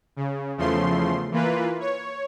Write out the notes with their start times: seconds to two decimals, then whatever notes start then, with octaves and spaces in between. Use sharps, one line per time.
0.16 C#3
0.58 E2 C#3 F3 A3 C6
1.31 E3 A#3 F4 B4
1.80 C#5